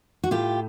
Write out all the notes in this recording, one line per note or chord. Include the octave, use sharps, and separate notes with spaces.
F#4
A2 F4 G4